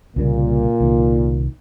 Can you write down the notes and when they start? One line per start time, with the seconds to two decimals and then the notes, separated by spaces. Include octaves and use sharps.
0.16 C2 A#2 C#3 G3
0.80 C2 D#3